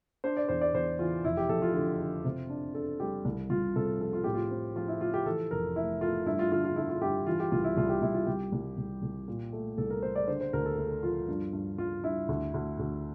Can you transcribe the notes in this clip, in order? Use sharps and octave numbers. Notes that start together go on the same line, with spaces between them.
D4 C5
D5
E2 C5
D5
E2 C5
E3 F4
F1 E4
G4
F2 A4
F4
D3
D3
C3
D4
D4 A4
G3 G4
C2
C2 F4
C3 A4
F3 A4
F4
A2 G4
F4
C4
F3 F4
E4
F3 F4
G4
E3 A4
F1 A#4
A3 E4
A3 F4
G2 E4
F4
D3 F4
F4
D3 E4
F4
G2 G4
E3 F4
G4
C2 F4
E4
C2 F4
G4
C2 E4
F4
C2 G4
C2
C2
C2
A#2
A3
C2 A4
A#4
A3 C5
D5
D3 C5
C5
D2 A#4
A4
A3 A4
F3 F4
G2
G2
G2 F4
G2 E4
D2
D2
D2